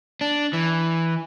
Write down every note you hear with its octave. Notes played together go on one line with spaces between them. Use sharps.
D4
E3